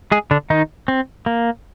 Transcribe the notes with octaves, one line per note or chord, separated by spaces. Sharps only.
G#3 G#4
D3 D4
D#3 D#4
C4
A#3